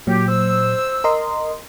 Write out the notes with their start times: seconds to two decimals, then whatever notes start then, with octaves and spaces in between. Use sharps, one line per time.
0.07 A#2 F#3 G4
0.29 C5 E6
1.04 A#4 D#5 C6